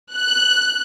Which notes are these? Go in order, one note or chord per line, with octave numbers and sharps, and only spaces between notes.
F#6